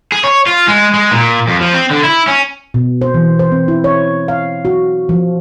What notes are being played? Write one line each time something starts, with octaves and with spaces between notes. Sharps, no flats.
G#4
C#5
F4
G#3
G#3
A#2
F2
F3
C4
D3
E4
C#4
B2
C5
E3
C5
C4
E4
C#5
F5
F#4
F3